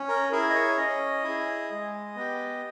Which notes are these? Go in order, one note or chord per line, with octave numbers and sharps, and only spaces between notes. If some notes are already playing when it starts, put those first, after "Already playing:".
Already playing: C#4
A#4
E4 G#4 A#4
D#5
C#5
C#4 D#5
E4
G#4
G#3
B3 G4